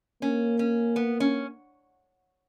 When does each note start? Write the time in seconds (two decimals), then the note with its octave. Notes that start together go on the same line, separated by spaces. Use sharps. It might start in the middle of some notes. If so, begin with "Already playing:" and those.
0.22 A#3 C#4
0.59 C#4
0.96 B3
1.20 C#4